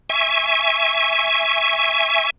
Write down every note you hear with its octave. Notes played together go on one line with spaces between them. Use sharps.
E5 G#5 C#6